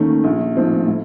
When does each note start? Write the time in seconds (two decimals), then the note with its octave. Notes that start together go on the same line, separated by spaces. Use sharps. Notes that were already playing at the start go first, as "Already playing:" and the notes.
Already playing: D#2 D#3 A3 C#4
0.24 A#1
0.56 A2 F3 C4 D#4
0.87 A2